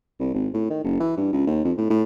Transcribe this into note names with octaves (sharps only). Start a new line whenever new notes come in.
C2
G#1
A2
D#3
F#1
E3
G2
C#2
D#2
F2
A2
A2